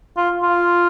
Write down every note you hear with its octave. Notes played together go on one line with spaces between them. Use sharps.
F4
F4